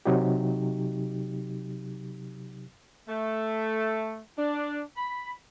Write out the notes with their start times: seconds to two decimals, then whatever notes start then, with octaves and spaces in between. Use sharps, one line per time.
0.05 C3 F#3 D#4 G4
3.08 A3
4.38 D4
4.96 B5